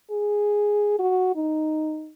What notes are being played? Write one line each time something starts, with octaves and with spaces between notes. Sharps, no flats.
G#4
F#4
D#4